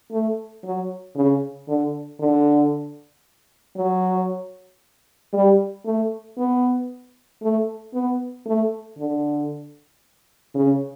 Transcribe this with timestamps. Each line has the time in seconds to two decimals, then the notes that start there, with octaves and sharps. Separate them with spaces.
0.11 A3
0.64 F#3
1.16 C#3
1.68 D3
2.20 D3
3.77 F#3
5.33 G3
5.85 A3
6.38 B3
7.42 A3
7.94 B3
8.46 A3
8.98 D3
10.55 C#3